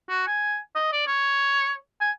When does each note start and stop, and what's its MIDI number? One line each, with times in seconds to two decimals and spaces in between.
0.09 0.25 66
0.27 0.58 80
0.75 0.89 75
0.92 1.03 74
1.07 1.74 73
2.01 2.11 80